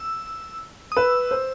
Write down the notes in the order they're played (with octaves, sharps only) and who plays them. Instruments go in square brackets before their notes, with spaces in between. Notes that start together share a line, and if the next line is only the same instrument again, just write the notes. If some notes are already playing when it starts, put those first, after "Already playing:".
Already playing: [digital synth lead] E6
D#6
[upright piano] B4 [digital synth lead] E6
[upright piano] C5